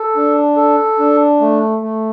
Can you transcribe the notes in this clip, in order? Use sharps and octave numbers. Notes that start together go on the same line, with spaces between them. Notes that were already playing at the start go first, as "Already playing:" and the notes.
Already playing: A4
D4
A4
D4
A3
A3